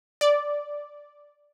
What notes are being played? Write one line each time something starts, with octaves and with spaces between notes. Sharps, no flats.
D5